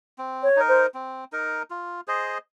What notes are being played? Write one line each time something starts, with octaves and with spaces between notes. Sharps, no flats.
C4
C#5
D#4 A#4
C5
C4
D#4 A#4
F4
G#4 C5 D#5